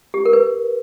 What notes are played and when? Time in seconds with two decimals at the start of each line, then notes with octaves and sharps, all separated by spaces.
0.14 G4
0.26 A#4
0.33 B4